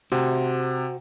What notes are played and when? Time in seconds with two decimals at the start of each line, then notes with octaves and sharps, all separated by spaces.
0.12 C3 F#4 C5